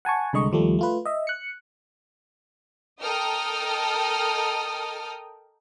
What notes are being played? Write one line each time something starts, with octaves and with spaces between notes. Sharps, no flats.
F#5 G#5 A5 C#6
C2 D3 G#3 D#5 C#6
D#2 F3 G3 A3
A3 F4 B4
D#5 E5
F#6 C#7
A4 A#4 D#5 G5 D#6 F6